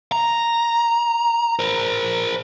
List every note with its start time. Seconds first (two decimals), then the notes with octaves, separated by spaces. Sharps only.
0.12 A#5
1.59 A#4 C5